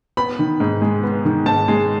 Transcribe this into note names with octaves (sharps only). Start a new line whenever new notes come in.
B3 B5
D#3
G#2
G#3
B3
D#3
G#2 A5
G#3